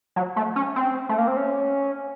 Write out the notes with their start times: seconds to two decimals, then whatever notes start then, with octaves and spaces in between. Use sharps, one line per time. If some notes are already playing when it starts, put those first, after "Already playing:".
0.16 F#3
0.36 A3
0.56 C#4
0.76 C4
1.09 A3
1.18 A#3
1.28 C4
1.37 C#4